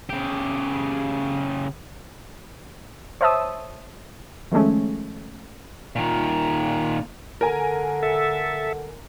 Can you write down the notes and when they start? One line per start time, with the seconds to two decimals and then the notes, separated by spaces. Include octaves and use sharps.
0.10 C#3 G4
3.21 C5 C#5 E5 A5 D#6 E6
4.52 D#3 F3 G#3 A3 C#4
5.96 A#2 D#3
7.41 D3 A#4 G#5
8.03 A4 E5